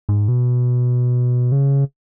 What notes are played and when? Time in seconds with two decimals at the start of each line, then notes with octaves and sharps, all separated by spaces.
0.09 G#2
0.28 B2
1.52 C#3